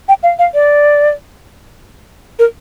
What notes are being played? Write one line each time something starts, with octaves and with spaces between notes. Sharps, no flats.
G5
F5
F5
D5
A#4